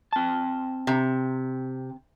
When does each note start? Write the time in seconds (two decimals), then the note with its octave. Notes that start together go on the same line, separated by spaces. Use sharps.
0.13 C4 A5
0.87 C3